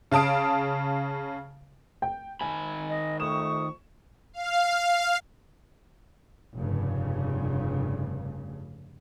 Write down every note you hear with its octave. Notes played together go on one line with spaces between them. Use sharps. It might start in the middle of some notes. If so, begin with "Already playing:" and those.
C#3 F5 A5 D#6 D7
G5
D#3 G#5 B5
D#5
F2 A3 C#6 D#6 E7
F5
F1 G2 C#3